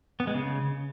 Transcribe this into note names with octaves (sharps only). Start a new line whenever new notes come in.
B3
G#3
C#3